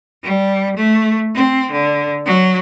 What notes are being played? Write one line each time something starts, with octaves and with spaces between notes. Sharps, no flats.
G3
A3
C4
D3
F#3